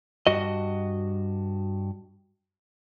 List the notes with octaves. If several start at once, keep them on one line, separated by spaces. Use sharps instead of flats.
G2 F#4 D#5